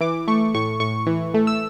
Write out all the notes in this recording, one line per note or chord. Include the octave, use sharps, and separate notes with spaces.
E3 D6
A3 C#6
A2 C#6
A2 C#6
E3
A3
E6